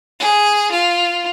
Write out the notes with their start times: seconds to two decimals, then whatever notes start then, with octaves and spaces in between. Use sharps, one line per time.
0.20 G#4
0.72 F4